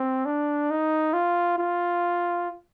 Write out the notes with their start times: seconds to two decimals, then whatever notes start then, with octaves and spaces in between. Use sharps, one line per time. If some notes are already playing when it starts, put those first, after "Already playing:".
Already playing: C4
0.26 D4
0.70 D#4
1.13 F4
1.58 F4